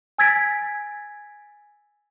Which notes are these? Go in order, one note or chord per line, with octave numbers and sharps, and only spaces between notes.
G#5 E6 G#6 A6 B6 D7